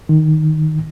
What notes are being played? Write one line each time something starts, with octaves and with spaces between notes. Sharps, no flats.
D#3